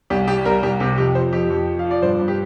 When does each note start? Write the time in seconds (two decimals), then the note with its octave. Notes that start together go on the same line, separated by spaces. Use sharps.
0.10 C2 G4
0.28 G3 G4
0.45 C2 A#4
0.63 C2 G4
0.80 C3 G4
0.98 F2 G4
1.15 F3 C5
1.33 F2 G4
1.50 F2
1.67 F3
1.79 F5
1.85 F3
1.91 D5
2.02 G2 C5
2.20 G2
2.28 G4